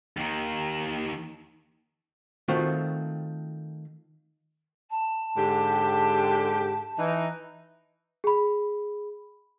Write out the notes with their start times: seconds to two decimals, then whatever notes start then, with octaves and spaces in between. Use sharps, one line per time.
0.17 D#2 D#3
2.48 D#3 A3 C4 F4 F#4
4.90 A5
5.37 G#2 D3 G4
6.99 E3 D#4
8.24 G#4 B5